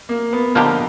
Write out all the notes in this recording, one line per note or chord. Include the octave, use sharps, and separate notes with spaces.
A#3
B3
D3 F3 A#3 D#4 G4